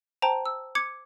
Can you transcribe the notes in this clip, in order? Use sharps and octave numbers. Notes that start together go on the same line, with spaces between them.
C5 G5 A5 A#5
E6
D6 G#6 C#7